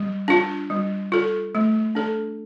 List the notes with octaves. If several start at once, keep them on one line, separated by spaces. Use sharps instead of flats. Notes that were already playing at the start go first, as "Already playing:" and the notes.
Already playing: G3
D4 F4
G3
F4 A4
A3
D4 A4